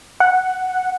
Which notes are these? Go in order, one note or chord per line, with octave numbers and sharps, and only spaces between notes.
F#5